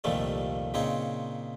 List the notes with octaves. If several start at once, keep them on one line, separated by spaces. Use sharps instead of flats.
C2 F2 A#2 D#3 G3 A3
A#2 C#3 C4 D#4 C#5